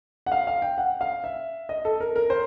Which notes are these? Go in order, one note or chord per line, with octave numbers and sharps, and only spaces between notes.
F#5
F5
F5
G5
F#5
F5
E5
D#5
A4
A#4
A#4
C5